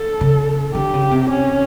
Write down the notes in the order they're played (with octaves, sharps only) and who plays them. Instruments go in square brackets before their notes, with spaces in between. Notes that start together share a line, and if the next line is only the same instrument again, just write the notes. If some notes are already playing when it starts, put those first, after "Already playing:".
Already playing: [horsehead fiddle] A4
[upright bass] C#3
[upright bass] D3 [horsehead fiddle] G4
[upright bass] C#3
C3
[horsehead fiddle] C#4